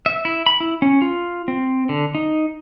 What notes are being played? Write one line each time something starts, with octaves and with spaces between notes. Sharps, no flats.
E5
E4
B5
E4
C#4
F4
C4
D3
D#4